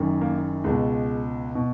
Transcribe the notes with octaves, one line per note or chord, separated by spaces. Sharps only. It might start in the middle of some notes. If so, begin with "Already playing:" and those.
Already playing: F#1 F#2 D#3
A#3
C#2 B2 G#3
B2